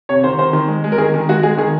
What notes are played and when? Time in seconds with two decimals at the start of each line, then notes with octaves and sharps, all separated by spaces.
0.09 C3 C#5
0.24 D#3 C5
0.39 D#3 C5
0.53 D#3
0.68 G#3
0.84 G#3
0.92 A#4
0.98 D#3 G#4
1.14 D#3
1.29 G#3 F#4
1.43 G#3 G#4
1.58 D#3 G#4